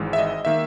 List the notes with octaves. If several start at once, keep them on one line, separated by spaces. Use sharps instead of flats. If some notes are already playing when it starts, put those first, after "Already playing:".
Already playing: G#1 G#2 E3 G#3
E5
D#5
D#3 A#3 E5